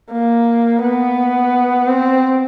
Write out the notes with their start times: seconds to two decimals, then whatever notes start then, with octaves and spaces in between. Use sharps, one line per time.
0.12 A#3
0.82 B3
1.88 C4